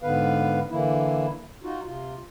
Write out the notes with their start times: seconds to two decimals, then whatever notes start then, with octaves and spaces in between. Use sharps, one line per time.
0.03 G#2 D3 B3 B4 F5
0.70 D3 E3 A#3 E4
1.63 D#4 F4 F#4
1.85 C3 F4